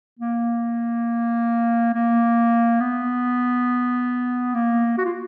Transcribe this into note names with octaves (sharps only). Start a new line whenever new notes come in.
A#3
A#3
B3
A#3
F#4
F4